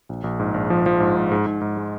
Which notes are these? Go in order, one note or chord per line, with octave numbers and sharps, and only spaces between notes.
A#1
A#1
G#2
A#1
F3
F3
G#2
G#2
G#2
G#2
G#2
G#3